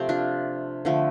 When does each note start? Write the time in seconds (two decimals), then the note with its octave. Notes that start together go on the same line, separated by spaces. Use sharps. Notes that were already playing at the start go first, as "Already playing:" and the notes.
Already playing: C3 F3 A3 C4 G4
0.09 D4 F4
0.85 D3 F3 A3